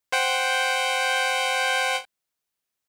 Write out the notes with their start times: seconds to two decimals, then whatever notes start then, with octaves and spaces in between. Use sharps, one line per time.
0.12 C5 F#5 G5